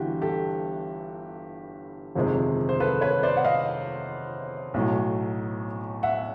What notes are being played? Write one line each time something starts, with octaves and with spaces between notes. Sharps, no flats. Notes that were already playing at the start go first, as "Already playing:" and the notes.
Already playing: G1 G2 E3 F#4 G4
G4 A4
G1 F2 C3 D#3 G#3
C5
A4 B4
B4 C#5
C5 D5
F#5
D#5 F5
B1 A2 F#3
E5 F#5